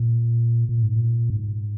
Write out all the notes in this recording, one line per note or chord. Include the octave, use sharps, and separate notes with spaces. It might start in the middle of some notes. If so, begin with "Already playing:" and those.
Already playing: A#2
A#2
G#2
A#2
G#2